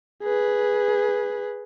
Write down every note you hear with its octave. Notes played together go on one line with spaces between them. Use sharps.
G#4 B4